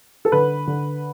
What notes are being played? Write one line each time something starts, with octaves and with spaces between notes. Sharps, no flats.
A4
D3 B4
D3